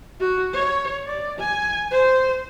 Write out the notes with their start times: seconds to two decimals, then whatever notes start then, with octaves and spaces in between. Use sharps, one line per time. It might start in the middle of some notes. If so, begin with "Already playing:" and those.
0.20 F#4
0.53 C#5
1.06 D5
1.39 G#5
1.91 C5